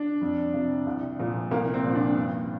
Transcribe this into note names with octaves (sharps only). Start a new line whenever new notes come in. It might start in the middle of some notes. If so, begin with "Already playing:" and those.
Already playing: D4
F2
C3 F3
C2
A#2 F3
C2 A#3
C4
A#2 F3
D4
G2